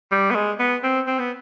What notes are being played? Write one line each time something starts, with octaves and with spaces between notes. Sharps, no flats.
G3
B3
G#3
B3
C4
C4
B3